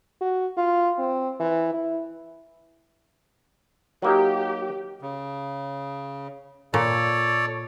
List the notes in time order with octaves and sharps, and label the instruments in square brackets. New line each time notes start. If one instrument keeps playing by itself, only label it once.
[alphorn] F#4
F4
C4
E3
E4
[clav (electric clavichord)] F#3 A#3 D#4 [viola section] G4
[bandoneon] C#3
[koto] A#2 [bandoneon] A4 C#5 D5